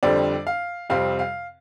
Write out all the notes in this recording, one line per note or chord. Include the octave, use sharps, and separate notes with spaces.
F2 D3 G3 C4 D5
F5
F2 C3 G3 C4 F5
F5